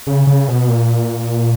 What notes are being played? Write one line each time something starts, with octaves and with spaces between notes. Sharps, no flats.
C#3
C#3
B2
A#2